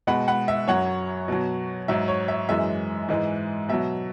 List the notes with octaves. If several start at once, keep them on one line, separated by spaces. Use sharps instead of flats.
B2 G#3 F#5 B5
F#5 B5
E5
F#2 F#3 C#5 F#5
B2 F#3
G#2 F#3 E5
C#5
E5
F#2 E3 G#3 E5
G#2 E3 G#3
B2 F#3 E5